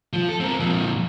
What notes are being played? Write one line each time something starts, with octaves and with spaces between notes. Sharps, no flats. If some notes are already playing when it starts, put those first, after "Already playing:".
F3 F4
A4
C4 A#4
F2 A#2